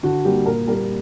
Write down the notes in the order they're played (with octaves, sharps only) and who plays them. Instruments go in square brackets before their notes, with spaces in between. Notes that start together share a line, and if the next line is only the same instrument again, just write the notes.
[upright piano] D3 F#4
G3 A#3 G4
A#2 A#4
G3 A#3 A#4